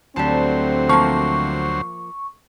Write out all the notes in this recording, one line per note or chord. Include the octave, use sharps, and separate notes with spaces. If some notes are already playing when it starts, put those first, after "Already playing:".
D2 D3 F#3 G3 A3 C4 C5 A5
F3 A#3 C#6